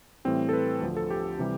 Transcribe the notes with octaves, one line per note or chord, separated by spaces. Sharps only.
A2 E3 G3 C4
A4
B4
D2 D3 F3
A4
G4
C3 E3 G3